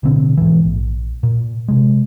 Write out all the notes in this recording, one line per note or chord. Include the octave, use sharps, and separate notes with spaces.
A1 B2 D3 C4
G#2 E3
A#1
A#2
C3 G#3